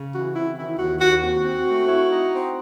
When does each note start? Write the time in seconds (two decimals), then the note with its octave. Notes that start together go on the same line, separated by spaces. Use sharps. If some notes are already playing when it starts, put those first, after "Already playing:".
Already playing: C#3
0.13 E3 F#4
0.35 C4 E4
0.57 D#3 E4
0.78 D#2 F#4
1.00 D#2 F#4
1.22 C4 F#4
1.45 C4
1.67 A3
1.88 E4
2.10 D#4
2.32 C4